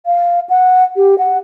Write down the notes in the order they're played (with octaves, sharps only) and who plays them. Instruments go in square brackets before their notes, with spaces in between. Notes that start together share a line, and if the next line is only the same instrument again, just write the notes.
[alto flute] F5
F#5
G4
F#5